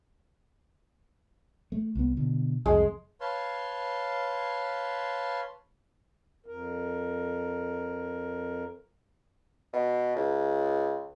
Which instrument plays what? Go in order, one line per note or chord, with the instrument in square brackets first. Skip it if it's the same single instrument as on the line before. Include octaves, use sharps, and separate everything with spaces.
[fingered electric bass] A3
C2 B3
B2 D3
[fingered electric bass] C2 F2 [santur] G#3
[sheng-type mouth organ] B4 C#5 F5 A5 C6
[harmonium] F2 A#4
[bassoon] B2
C#2